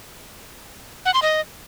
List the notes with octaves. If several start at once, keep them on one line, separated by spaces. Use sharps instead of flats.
F#5
C6
D#5